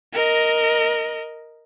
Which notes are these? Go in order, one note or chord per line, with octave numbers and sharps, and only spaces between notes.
A#4 D#5